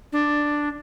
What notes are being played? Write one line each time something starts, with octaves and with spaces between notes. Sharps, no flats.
D4